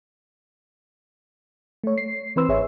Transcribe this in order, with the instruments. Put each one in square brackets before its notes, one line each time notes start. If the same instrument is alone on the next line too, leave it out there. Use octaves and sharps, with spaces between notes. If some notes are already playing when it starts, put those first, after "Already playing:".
[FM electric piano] A3 C#5
C7
E3 C4 B4 C6 E6
G#1 G#4 C#5 E5